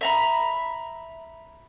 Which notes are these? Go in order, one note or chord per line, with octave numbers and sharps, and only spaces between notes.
E5 A#5 B5